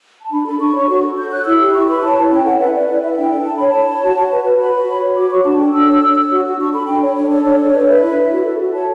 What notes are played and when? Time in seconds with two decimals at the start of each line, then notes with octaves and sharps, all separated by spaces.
0.22 A5
0.31 D4 B5
0.46 A4 B5
0.60 D4 C#6
0.74 C#5
0.89 F#4
1.03 A4
1.17 F#4 G6
1.31 C#5 F#6
1.46 E4 E6
1.59 G4
1.74 E4 C#6
1.88 B4 B5
2.02 C#5 A5
2.17 E4
2.31 C#4 G5
2.45 A4 F#5
2.60 B4 E5
2.74 B4 D5
2.88 E4 D5
3.02 E4 E5
3.12 F#5
3.16 D4 G5
3.31 A4
3.45 D4 A5
3.57 C#5 B5
3.68 A5
3.74 C#5
3.88 C#5
4.03 F#4
4.16 F#4
4.31 B4
4.45 B4
4.59 F#4 B5
4.74 F#4
4.88 C#5
5.02 C#5
5.16 F#4 D6
5.31 F#4 C#6
5.45 D4 A5
5.59 A4 G5
5.73 D4 E6
5.88 C#5
6.02 C#5
6.16 C#5
6.30 F#4
6.44 F#4
6.59 D4 C#6
6.74 A4 B5
6.87 D4 G5
7.02 C#5
7.16 D4 C#5
7.31 A4 C#5
7.44 D4 C#5
7.60 C#5
7.73 B4 D5
7.87 B4 E5
8.02 E4
8.16 E4
8.30 F#4
8.44 A4
8.59 F#4
8.73 C#5 A5